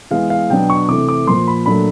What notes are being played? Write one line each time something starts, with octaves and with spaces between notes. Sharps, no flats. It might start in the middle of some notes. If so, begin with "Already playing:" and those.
E3 G#3 B3 F5
F5
B2 F#3 B3 D4 G5
C#6
C3 E3 A3 D6
D6
A#2 F3 A#3 C6
B5
A#2 F#3 A3 D4 B5